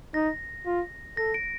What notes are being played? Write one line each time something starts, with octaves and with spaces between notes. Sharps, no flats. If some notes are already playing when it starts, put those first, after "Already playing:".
D#4 A#6
F4
A4 A#6
D7